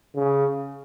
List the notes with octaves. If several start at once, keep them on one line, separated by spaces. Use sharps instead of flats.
C#3